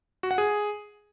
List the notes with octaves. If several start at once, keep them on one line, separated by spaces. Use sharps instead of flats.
F#4
F#5
G#4